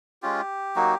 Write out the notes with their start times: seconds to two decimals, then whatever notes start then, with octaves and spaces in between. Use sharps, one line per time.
0.22 G#3 C#4 F4 G4
0.76 F#3 A#3 D#4 F#4